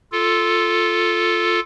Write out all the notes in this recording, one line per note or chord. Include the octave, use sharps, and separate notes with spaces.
F4 A4